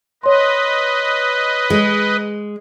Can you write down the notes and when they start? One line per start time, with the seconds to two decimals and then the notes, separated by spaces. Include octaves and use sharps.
0.23 B4 C#5 D#5 C6
1.70 G#3